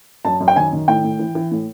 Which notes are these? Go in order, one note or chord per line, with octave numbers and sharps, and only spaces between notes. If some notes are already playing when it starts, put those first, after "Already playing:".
F#2 A5
F#2
G5
D#3 G#5
D#3
A2 G5
A2
E3
E3
A2